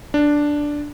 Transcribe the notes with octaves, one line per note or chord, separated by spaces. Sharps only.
D4